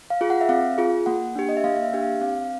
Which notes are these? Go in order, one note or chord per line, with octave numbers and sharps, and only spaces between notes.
F5
F4 G#4
F#5
E5
C4 F5
F4 G#4
A#3 F#5
D4 G4
D#5
E5
A#3 F5
F5
E5
D4 G4
F5
C4 F5